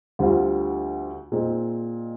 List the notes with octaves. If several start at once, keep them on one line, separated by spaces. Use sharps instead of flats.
D2 D3 G3 C4 F4
A#2 G#3 C4 D#4